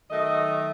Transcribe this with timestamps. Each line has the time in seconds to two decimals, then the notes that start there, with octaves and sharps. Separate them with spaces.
0.10 D#3 F#3 A3 D#5